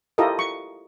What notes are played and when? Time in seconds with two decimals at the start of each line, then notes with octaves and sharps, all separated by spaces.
0.18 E4 F4 G4 A4 A#4 D#5
0.39 C#6